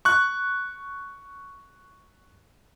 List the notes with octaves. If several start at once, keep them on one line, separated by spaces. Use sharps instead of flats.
C#6 F#6